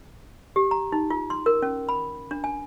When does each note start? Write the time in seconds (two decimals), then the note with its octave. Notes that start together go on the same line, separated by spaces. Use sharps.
0.56 G4
0.71 A#5
0.92 D#4
1.10 F4
1.30 C6
1.46 A#4
1.62 C#4
1.89 B5
2.31 D4
2.44 G#5